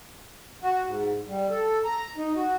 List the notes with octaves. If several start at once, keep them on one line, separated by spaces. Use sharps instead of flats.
F#4
G#2
G3
A4
A#5
D#4
F#4